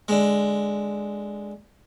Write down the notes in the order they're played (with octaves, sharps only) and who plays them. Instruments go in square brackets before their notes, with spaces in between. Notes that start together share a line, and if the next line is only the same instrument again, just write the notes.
[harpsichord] D3 G#3